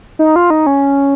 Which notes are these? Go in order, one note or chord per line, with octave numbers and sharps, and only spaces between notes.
D#4
F4
D#4
C#4